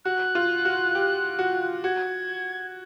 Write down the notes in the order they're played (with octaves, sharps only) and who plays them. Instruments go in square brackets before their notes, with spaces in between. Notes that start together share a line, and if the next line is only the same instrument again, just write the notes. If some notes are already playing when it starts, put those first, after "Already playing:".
[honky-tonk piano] F#4 [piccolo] F#6
[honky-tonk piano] F4
F#4
G4
F#4
[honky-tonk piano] F#4 [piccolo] G#6